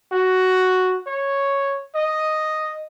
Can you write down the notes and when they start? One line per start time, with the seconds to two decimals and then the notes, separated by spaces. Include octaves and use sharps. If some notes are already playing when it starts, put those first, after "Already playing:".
0.12 F#4
1.07 C#5
1.95 D#5